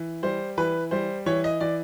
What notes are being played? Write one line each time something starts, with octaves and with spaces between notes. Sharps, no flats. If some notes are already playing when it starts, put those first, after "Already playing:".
Already playing: E3
G3 C5
E3 B4
G3 C5
E3 C#5
D#5
E3 D5